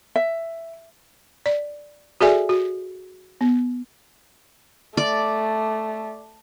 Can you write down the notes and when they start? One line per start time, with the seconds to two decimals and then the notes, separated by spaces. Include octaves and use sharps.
0.16 E5
1.46 D5
2.21 F#4 G#4 A4 D5 E5 G#5
2.49 F#4
3.41 B3
4.97 A3 D5